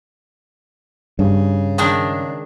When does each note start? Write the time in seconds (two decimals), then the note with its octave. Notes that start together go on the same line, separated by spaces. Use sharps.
1.19 G2 C#3
1.78 D#3 G#3 D4